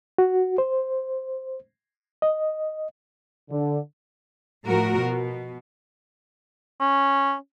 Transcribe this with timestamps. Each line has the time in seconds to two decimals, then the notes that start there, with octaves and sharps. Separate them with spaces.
0.18 F#4
0.58 C5
2.22 D#5
3.51 D3
4.65 A2 F3 F#4 A#4
4.98 B2
6.81 C#4